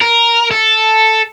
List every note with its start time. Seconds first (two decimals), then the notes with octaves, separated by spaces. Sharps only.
0.01 A#4
0.51 A4